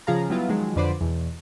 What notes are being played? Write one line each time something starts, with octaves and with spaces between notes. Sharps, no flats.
C#3 F3 G#4 F5 A#5
F#3 G3 B3 E4 F4
D#3 F3 F#3 G#3
F2 D3 B4 C5 D5
E2 B2